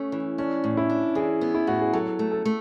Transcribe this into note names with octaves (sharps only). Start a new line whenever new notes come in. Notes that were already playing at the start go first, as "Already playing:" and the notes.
Already playing: A3 C#4
E3
C#4 D4
A2
E4
D4
E3 G#4
B3
E4
A2 F#4
G#4
F#3 A4
A3
A4
A3